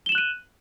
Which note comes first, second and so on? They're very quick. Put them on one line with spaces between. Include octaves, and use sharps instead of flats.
G7 E7 F#7 F#6 D#7